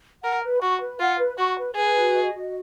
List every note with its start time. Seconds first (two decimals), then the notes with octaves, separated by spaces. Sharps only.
0.23 A#4 F#5
0.43 B4
0.62 F#4 C#6
0.80 B4
1.00 F4 F#5
1.19 B4
1.38 F#4 C#6
1.58 B4
1.76 G#4 B4
1.96 F#4
2.14 D#5
2.34 F#4